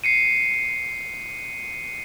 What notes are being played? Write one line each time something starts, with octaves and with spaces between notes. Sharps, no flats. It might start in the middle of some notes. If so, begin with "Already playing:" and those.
C7 C#7 D#7